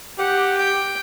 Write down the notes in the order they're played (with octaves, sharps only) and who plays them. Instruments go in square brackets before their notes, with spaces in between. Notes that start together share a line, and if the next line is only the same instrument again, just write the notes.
[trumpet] G4 [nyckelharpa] F#5
[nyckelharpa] G5